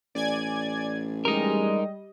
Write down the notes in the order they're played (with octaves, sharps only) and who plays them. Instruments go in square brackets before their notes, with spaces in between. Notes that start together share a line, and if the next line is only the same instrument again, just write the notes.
[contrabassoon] A1 [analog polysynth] D5 G#5 G#6
[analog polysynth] G3 D#5 [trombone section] G#3 [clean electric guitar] D#4 A#4